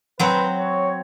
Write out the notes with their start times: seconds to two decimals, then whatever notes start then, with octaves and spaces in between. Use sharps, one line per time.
0.19 F#3 C4 B4
0.58 C#5